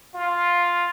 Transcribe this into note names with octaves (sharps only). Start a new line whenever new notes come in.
F4